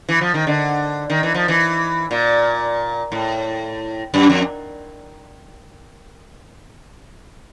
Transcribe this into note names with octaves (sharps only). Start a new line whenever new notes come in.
E3
F3
D#3
D3
D#3
E3
F3
E3
A#2
A2
F#2
F2